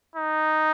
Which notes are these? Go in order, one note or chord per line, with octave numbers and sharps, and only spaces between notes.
D#4